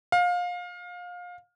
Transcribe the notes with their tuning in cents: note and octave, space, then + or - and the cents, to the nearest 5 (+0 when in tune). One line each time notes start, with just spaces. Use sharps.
F5 +25